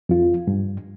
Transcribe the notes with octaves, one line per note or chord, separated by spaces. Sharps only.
F2 F4
G2